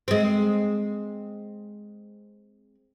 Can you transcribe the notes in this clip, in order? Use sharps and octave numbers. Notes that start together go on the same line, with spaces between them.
G#3 C4